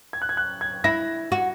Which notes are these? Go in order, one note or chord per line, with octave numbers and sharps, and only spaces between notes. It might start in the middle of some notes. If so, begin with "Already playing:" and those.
G#6
F#6
G#6
F#6
G#6
E4 A#6
F#4